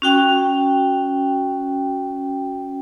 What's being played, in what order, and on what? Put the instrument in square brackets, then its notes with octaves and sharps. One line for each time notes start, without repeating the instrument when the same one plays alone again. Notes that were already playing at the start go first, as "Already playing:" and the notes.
[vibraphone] C#4 F#4 G5